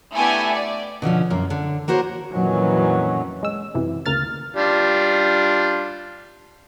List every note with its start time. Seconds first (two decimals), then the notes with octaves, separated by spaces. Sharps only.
0.15 A3 B3 D4 E4 G4 G#5
0.55 D5
1.02 B2 D3 F3 C#4
1.30 F#2 A#3
1.50 D3
1.88 A#3 F#4 A#4 C5 C#5
2.32 F2 A#2 D#3 E3 F#3 C#4
3.43 G#3 E6
3.75 F#2 C3 E3
4.06 D2 C#3 A#3 F6 A6
4.56 G3 D4 F4